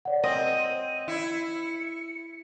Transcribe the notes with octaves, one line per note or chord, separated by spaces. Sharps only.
C#5 D5 F#5
C4 D#5 D#7
E4 C#7